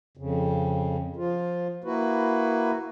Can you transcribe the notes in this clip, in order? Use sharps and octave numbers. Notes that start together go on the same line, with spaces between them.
F2 C#3
F3 F4
A#3 E4 F#4 B4